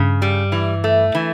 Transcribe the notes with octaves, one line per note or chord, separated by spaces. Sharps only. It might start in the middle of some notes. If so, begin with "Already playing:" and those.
Already playing: G2 C#3
G3
E3
A3
E3